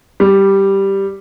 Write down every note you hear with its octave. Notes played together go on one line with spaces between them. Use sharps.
G3